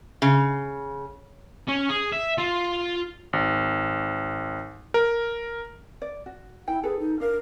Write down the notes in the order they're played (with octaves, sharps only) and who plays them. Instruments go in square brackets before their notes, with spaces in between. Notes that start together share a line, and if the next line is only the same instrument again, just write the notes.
[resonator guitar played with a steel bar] C#3
[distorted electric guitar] C#4
G#4
E5
F4
[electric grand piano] G#1
A#4
[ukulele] D5
F#4
[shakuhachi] E4 [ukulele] G5
[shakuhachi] G#4 [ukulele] A4 B4
[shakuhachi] D#4
[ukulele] D4 F5 [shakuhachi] A#4